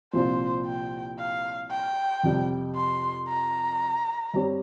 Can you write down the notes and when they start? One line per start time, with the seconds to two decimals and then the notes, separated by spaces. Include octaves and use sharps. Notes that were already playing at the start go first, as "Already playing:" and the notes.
0.13 C2 A#2 F3 C4 F4 C5
0.66 G5
1.19 F5
1.71 G5
2.23 F2 C3 G3
2.76 C6
3.29 A#5
4.34 G2 G3 C4 G4 C#5